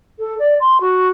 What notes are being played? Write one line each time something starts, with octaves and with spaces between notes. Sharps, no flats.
A4
D5
C6
F#4